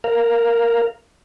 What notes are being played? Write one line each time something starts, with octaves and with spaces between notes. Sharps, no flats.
A#4 F5